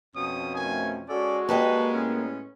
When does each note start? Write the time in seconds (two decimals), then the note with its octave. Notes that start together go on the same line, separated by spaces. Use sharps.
0.16 F2 B2 C#4 D#6
0.55 D#3 F3 A3 G#5
1.09 G#3 C#4 F#4 A4 D5
1.49 A#3 G4 A4 B4 D#5
1.93 A2 B3 C#4